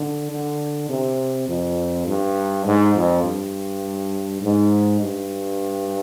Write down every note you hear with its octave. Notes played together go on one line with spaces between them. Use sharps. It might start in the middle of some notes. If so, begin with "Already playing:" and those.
Already playing: D3
D3
C3
F2
G2
G#2
F2
G2
G#2
G2